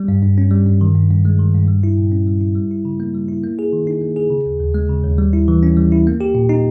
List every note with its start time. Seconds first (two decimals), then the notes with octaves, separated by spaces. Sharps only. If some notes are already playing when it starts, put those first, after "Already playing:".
Already playing: G3
0.08 G2
0.23 G2
0.38 C#4
0.51 G3
0.67 G2
0.81 D#3
0.95 G2
1.10 G2
1.25 G#3
1.39 D#3
1.54 G2
1.68 G3
1.83 E4
1.98 A#2
2.12 C#4
2.27 G3
2.41 E4
2.55 G3
2.71 E4
2.85 C#3
3.00 A#3
3.15 G3
3.28 E4
3.44 A#3
3.59 G#4
3.73 D#3
3.87 D#4
4.01 A#3
4.16 G#4
4.30 C#3
4.46 D#2
4.60 D#2
4.74 G#3
4.89 C#3
5.04 D#2
5.19 G3
5.33 E4
5.48 E3
5.63 C#4
5.77 G3
5.92 E4
6.07 A#3
6.21 G4
6.35 A#2
6.49 D#4